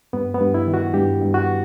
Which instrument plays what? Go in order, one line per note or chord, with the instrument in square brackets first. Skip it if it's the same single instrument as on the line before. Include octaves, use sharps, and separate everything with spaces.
[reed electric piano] G2 B3
B3
G2
E4
D#3
F#4
G2 G4
G2
F#4